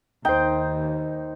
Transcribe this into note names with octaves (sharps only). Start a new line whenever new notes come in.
D#2 A#3 D#4 C5 G5